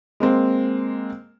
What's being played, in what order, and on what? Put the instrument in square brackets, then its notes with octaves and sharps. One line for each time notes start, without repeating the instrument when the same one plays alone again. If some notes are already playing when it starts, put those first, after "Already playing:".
[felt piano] G#3 A#3 C4